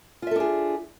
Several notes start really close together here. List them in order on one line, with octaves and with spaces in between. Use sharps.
F4 E5 A4 D4 G#4